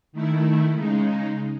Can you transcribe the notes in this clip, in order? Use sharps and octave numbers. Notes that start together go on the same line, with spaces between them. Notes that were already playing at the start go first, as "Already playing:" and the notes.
D#3 A3 E4
C#3 G#3 D#4